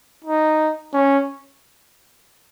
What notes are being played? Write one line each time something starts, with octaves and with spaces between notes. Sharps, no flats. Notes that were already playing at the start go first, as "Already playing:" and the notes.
D#4
C#4